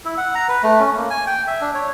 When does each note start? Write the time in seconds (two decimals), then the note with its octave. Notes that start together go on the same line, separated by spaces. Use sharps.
0.05 E4
0.17 F#5
0.35 A#5
0.49 B4
0.63 A3
0.80 C#4
0.96 A#3
1.10 G#5
1.27 G5
1.47 E5
1.61 D4
1.74 C#5